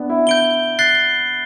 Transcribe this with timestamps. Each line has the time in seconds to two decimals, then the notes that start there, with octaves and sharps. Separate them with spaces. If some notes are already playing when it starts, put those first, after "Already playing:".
Already playing: B3 D4
0.10 E4
0.27 E4 G6 D7 G7
0.79 F#6 A6 C7 G7